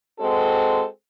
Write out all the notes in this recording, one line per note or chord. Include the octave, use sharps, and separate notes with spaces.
G#3 C4 F#4 A4